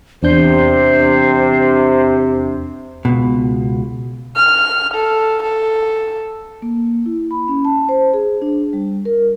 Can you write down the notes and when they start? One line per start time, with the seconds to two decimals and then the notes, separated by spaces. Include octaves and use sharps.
0.23 E2 C3 D4 C5 G6
3.05 C#2 B2
4.36 F6
4.94 A4
5.43 A4
6.62 A#3
7.06 E4
7.31 B5
7.48 C#4
7.65 A5
7.89 C5
8.14 G#4
8.42 D4
8.73 G3
9.05 A#4